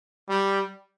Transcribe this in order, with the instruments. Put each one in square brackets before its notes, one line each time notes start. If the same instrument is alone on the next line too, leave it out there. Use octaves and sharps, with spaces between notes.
[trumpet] G3